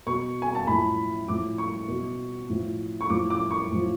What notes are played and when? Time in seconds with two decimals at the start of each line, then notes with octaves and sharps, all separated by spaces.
0.06 B2 C#6
0.42 G#5
0.55 A5
0.67 A2 F3 B5
1.28 A2 F3 D6
1.58 C#6
1.88 B2
2.49 A2 F3
3.01 C#6
3.10 A2 F3 D6
3.30 D6
3.51 C#6
3.71 A2 F3